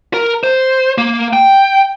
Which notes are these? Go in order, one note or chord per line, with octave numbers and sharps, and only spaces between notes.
A#4
C5
A#3
G5